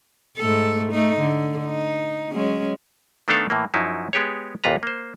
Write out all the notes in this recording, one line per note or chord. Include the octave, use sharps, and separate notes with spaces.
G#2 A3 A4
A3 D#4
D3
D#4
F#3 G#3 C#4
D#3 A3 B3 D4 A4 F5
A2 E3 A#3
F#2 F3 F#3 D#4 E4
G#3 B3 G4 G#4 C#5
A1 D#2 A#2 F4 B4 A#5
A#3 C5